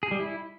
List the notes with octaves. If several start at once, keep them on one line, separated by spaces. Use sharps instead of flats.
G#4
G3
E4